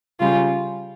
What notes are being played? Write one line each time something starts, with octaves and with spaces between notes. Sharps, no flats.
C#3 G3 C#4 F4